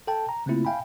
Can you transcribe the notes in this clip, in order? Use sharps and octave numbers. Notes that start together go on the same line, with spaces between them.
A4 G5 A5
A#5
C#3 A3 A#3 C4 E4 F4
E5 F5 G5 G#5 B5